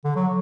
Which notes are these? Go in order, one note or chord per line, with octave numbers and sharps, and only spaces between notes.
D3
F#3